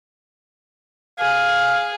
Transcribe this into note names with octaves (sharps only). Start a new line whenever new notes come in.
G#4 F5